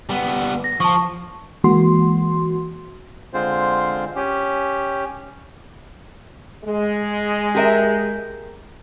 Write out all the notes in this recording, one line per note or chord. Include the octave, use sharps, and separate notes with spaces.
G3 B3
A#6
F3 A5 C#6
E3 G#3 A#3 F#4 C6
D3 G#3 C4 F4 C5
C#4 G4
G#3
G4 A#4 E5